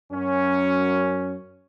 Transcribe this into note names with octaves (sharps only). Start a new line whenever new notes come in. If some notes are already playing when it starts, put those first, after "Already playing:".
F#2 C#4